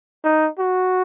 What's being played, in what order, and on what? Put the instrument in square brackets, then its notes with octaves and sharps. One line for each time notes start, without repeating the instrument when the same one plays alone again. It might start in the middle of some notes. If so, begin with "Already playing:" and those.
[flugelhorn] D#4
F#4